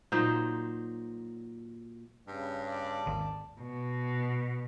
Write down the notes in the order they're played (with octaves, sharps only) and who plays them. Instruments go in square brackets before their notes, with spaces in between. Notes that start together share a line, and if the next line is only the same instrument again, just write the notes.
[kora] A#2 F#3 D#4 C5
[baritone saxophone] G2 [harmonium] C#3
[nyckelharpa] D5 A5
[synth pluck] G#1 D#2 D#3
[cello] B2